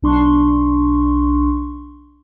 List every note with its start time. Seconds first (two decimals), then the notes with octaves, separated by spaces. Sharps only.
0.02 B1 D4 C6 C#6